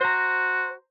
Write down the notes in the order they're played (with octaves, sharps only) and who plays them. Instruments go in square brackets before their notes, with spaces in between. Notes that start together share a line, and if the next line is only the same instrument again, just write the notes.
[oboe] F#4 [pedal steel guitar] C5 A#5